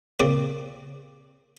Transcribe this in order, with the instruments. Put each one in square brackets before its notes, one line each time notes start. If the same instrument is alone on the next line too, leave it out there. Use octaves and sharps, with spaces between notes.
[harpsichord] A#2 C#3 C4 D5